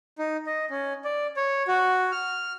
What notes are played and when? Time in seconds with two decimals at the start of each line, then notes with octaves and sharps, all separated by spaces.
0.19 D#4
0.46 D#5
0.70 C#4
1.05 D5
1.37 C#5
1.68 F#4
2.12 F6